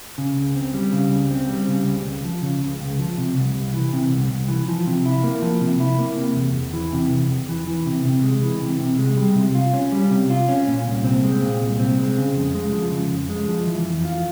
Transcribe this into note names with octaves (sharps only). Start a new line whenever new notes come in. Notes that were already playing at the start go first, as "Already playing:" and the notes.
C#3
C#2
C4
G3
C#3
C#2
C4
G3
C#3
C#2
C#2
F3
C#3
C#2
C#2
F3
C3
C2
C2
E3
C3
C2
C2
E3
F3
C3
E4
A#3
F3
C3
E4
A#3
C3
E2
E2
E3
C3
E2
E2
E3
E3
C3
C3
G#3
E3
C3
C3
G#3
G3
C3
F4
C#4
G3
C3
F4
C#4
A#2
C2
C4
G#3
A#2
C2
C4
G#3
C#3
F2
G#3
F3
C#3
F2
G#3
F3
E3
F2
F4